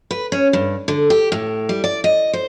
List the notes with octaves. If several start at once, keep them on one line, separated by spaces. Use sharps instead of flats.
B4
C#4
G2
D3
G4
A2
G3
D5
D#5
C5